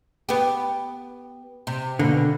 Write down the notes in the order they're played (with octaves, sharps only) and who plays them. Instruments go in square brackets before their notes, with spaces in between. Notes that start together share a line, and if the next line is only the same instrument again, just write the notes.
[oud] B3 G4
C3
[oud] B2 [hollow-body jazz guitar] D3 A#3